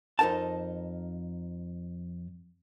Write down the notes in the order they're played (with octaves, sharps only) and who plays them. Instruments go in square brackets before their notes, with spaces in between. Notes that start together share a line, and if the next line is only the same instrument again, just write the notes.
[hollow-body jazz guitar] F2 D#4 A#4 G5 A5